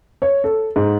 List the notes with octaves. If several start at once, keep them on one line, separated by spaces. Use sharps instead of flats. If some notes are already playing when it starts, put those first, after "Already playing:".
C#5
A4
G#2